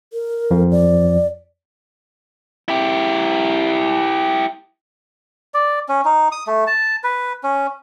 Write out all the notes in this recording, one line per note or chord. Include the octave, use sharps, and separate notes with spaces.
A#4
F2 F3
D5
E4 G4
D5
C#4
D#4
D#6
A3
A5
B4
C#4